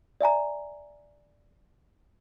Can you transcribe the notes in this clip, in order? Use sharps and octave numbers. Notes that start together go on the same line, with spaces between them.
D5 E5 G#5 A#5